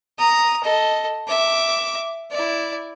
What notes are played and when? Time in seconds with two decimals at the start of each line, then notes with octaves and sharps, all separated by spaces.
0.18 A#5 D#6
0.64 A4 D#5
1.28 E5 D6
2.31 E4 D5